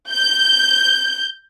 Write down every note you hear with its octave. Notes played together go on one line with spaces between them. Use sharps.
G6